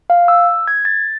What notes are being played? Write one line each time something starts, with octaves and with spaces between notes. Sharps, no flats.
F5
E6
G#6
A6